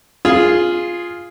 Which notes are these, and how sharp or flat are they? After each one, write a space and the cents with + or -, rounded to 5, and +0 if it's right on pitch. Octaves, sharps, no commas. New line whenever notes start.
F4 +0 G#4 +0